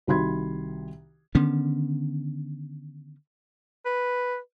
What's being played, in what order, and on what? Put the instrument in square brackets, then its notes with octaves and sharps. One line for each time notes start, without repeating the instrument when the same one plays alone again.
[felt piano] C2 D#3 F#4 B5 C6 G#6
[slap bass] D3 D#3 B3 C#4
[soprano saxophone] B4